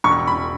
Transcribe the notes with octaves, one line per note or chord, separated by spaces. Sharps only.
E1 C#6
B5